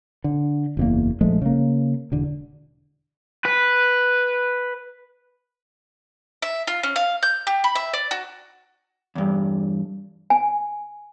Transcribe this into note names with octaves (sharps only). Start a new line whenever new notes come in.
D3
F#1 E2 A#3
A#1 F3 G#3 A3
C#3 A#3
E1 D3
B4
E5
F4
C#4
F5
G6
G4
B5
E5
D5
F#4
E2 G2
G#5